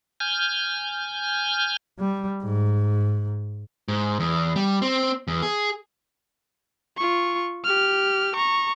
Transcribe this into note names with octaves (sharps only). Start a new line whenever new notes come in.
G#5 F6 G6
G3
G#2
G#2
E2
G3
C4
E2
G#4
F4 C#6
G4 F6
A#5 C#6